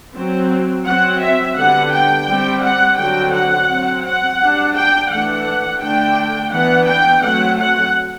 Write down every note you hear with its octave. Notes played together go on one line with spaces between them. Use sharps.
F#3 C4
F#3 C4 F#5
E5
D3 G3 B3 F#5
G5
G3 C4
F#5
D3 F#3 C4 G5
F#5
F#3 C4
F#5
G3 D4
G5
E3 A3 D4 F#5
D3 A3 D4 G5
E3 B3 D4 F#5
G5
F#3 A3 C4 F#5
F#5